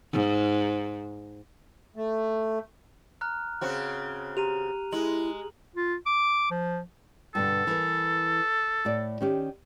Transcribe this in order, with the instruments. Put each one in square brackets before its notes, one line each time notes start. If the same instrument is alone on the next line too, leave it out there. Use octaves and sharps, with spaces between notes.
[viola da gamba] G#2
[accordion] A3
[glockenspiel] A#5 F6 F#6
[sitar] C#3 C4 F#4
[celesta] G4 [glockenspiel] A#5 D#7 F7
[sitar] G#3 [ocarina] E4 [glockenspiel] F#7
[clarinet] F4
D6
F3
[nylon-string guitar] G2 B2 D3 [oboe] A4
[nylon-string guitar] E3 A#4
A2 D5
D#3 C#4 G4